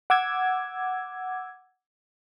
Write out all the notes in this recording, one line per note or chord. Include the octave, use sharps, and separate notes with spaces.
F#5 D6 E6 G#6